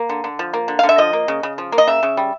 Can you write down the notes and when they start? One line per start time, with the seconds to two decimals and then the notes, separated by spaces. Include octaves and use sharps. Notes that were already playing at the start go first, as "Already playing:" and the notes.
Already playing: A#3
0.09 D3
0.24 D3
0.39 F3
0.54 A#3
0.68 D3
0.79 F5
0.83 D3
0.89 E5
0.98 F3 D#5
1.13 A#3
1.28 C#3
1.43 C#3
1.58 F3
1.72 A#3
1.78 D#5
1.88 C#3 E5
2.03 C#3
2.17 G3